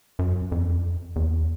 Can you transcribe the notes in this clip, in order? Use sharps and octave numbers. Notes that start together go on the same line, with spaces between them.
F#2
F2
E2